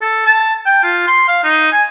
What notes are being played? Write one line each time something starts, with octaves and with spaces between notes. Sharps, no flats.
A4
A5
G5
F4
C6
F5
D#4
G#5